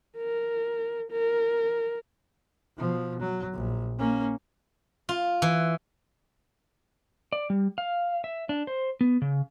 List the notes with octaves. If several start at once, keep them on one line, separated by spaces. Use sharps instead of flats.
A#4
A#4
B2 F3
F#3
A#1
A#3 C#4
F4
E3
D5
G3
F5
E5
D4
C5
B3
C#3